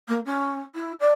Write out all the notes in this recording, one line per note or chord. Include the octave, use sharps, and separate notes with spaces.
A#3
C#4
E4
D5